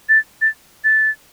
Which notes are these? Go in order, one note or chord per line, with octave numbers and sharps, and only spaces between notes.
A6
A6
A6